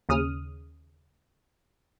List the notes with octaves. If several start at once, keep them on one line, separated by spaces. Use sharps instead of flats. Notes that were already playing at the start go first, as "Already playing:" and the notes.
D#2 C#3 D#6 F6